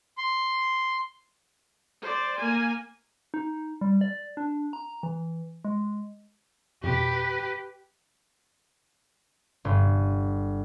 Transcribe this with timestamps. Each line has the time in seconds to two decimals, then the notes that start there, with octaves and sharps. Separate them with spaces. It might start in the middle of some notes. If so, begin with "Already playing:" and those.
0.18 C6
2.02 C5 D5
2.38 A#3 G#5
3.34 D#4
3.81 G3
4.01 D5
4.37 D4
4.73 A#5
5.03 E3
5.64 G#3
6.83 F2 B2 G4 B4
9.65 G1